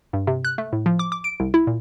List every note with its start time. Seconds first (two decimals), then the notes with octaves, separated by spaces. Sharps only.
0.13 G2
0.27 C3
0.45 F#6
0.58 A3
0.73 A2
0.86 F3
0.99 D6
1.12 D6
1.24 D7
1.40 C2
1.54 E4
1.67 A#2